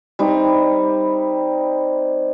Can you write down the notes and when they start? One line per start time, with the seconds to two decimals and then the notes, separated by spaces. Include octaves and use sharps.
0.19 G3 C4 D#4